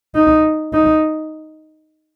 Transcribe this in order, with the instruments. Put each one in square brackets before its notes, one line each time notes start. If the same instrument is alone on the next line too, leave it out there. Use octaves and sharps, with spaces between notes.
[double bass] D#4
D#4